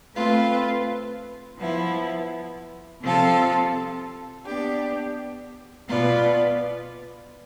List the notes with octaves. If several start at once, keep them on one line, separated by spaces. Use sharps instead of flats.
A3 C4 F4 B4
F3 B3 E4
C3 F3 C4 F4 A4
B3 D4 G4
B2 B3 F4 B4 D5